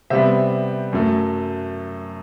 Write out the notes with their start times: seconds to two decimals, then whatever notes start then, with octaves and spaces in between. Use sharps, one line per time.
0.10 C3 G3 B3 C5 E5
0.93 F#2 F#3 A3